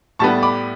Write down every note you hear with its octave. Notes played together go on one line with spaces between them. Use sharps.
A2 G3 B3 A5 C#6
B5 D6